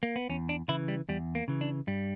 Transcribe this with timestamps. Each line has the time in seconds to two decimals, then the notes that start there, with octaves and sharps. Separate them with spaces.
0.03 A#3
0.16 B3
0.29 E2 C#4
0.49 D4
0.68 C#3 E3 E4
0.88 G3
1.09 E2 G3
1.35 A#3
1.48 C#3 E3
1.61 D4
1.87 G2 G3